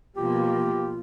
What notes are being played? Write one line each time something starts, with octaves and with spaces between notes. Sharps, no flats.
B2 F3 A#3 F4 G4